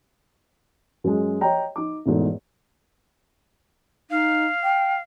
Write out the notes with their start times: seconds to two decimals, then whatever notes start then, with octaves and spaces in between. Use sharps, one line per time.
1.04 F#2 G#3
1.41 C#5 D#5 G5 A#5
1.76 D#4 D6
2.06 E1 E2 G#2 A3
4.10 D#4 F5
4.63 G5